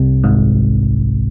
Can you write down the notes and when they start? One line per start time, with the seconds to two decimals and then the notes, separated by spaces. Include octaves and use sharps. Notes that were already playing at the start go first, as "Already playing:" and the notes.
Already playing: C2 C3
0.24 G#1 G#2